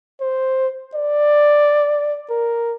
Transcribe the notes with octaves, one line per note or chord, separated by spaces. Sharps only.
C5
D5
A#4